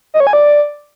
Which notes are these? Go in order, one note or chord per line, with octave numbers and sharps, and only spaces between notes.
D#5
C#5
G#5
D5